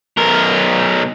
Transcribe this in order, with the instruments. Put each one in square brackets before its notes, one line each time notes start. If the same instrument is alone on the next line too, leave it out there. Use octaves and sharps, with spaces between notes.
[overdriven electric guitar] B1 A#4